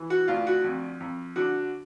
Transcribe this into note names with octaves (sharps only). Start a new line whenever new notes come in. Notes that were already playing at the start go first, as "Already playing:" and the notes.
Already playing: E3
F#4
D2 F4
F#4
F2
F2
D3 F#4